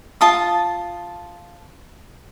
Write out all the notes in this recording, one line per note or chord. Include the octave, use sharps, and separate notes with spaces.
F4 A5 D#6